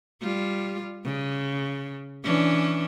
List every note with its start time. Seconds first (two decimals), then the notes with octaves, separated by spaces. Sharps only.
0.22 G3 F4
1.04 C#3
2.24 E3 C#4 D4